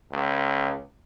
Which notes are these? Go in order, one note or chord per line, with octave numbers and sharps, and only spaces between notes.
C#2